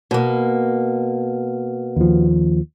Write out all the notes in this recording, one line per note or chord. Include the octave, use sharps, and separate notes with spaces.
B2 A#3
D#2 F3